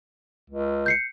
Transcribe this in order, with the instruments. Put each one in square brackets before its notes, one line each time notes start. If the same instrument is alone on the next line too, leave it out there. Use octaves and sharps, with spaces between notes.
[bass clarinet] C#2
[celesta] G6 C7 C#7